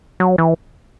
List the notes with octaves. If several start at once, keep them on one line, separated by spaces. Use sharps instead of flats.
F#3
E3